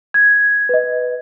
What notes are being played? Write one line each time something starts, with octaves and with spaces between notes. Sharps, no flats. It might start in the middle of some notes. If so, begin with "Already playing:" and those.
G#6
B4 D#5